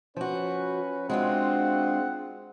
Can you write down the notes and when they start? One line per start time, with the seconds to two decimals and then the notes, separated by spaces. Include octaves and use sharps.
0.17 F3 C#4 F#4 B4
1.10 G#3 C4 D4 F4 F#4 F#5